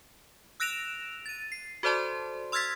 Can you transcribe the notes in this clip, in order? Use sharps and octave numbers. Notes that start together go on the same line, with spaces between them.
E6 F#6 A#6 D7 E7 F7
A6 D#7
C7
F#4 A4 C5 D5 A5 C6
C6 E6 F6 G#6 A6 B6